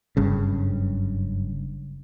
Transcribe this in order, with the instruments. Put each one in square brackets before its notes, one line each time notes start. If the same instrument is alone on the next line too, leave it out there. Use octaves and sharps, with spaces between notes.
[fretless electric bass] F#1 G2 C#3